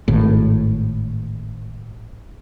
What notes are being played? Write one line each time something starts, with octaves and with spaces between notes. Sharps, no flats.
G#1 A2